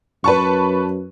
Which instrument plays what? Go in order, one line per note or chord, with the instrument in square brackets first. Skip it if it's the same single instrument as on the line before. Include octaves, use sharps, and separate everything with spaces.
[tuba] F#2 [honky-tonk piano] B4 A5 C#6